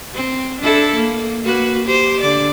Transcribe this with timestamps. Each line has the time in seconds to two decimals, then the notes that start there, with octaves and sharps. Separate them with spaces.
0.14 C4
0.60 D4 E4 A4
0.95 A#3
1.43 A#3 F#4 B4
1.86 G4 C5
2.21 D3 D5